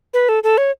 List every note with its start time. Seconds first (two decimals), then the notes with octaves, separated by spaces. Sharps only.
0.14 B4
0.29 A4
0.43 A4
0.58 C#5